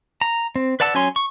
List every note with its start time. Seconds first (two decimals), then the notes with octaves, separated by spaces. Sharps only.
0.21 A#5
0.56 C4
0.80 B4 D5 F#5 A5 E6
0.94 F#3 C#4 C#5 G#5 C6
1.16 C#6